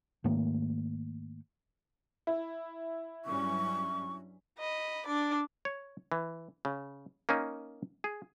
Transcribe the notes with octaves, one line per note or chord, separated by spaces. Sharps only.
G#2 D#3 A3 A#3
E4
G2 F#3 C#4 C#6
D#5 B5
D4 D5
C#5
E3
C#3
A#3 C#4 D#4
G#4